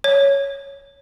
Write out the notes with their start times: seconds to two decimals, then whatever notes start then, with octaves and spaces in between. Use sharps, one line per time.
0.04 C#5